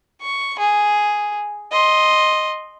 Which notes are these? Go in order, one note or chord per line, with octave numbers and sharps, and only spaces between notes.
C#6
G#4
D#5 C6